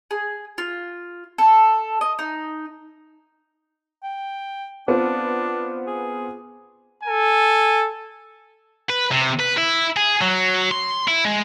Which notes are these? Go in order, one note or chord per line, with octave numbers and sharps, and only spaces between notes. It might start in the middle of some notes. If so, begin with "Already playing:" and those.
G#4
F4
A4
D#5
D#4
G5
B3 C4 D4 F4
G#4
A4 G#5
B4
C3
B4
E4
G#4
F#3
C6
E4
G#3